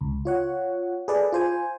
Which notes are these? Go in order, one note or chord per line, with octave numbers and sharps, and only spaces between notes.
C#2
F4 C#5 F#5
G#4 A4 B4 D5
F4 C5 G#5